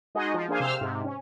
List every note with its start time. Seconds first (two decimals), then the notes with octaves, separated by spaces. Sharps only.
0.15 G#3 D#4 F#4 G#4 D#5
0.34 F3
0.48 A#3 D4 G#4 C5 F5 G#5
0.60 C3 C5 F5 E6 F6
0.81 G#2 C3
1.04 C#4